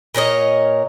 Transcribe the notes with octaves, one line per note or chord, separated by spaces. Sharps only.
A#2 A#4 C#5 D#5